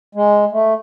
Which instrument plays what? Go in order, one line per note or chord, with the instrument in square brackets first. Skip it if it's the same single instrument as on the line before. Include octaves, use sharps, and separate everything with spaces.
[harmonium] G#3
A3